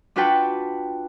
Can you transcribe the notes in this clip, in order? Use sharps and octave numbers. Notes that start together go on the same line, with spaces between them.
D4 F4 F#4 B4 G5 A5